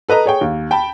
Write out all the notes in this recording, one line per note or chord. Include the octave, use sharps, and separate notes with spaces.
A4 B4 D#5 A#5
G#4 C#5 G5
D#2
G5 A5 B5